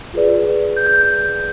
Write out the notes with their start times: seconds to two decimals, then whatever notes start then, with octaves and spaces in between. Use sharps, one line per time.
0.14 F4 G#4 B4 D5
0.76 G6
0.87 G6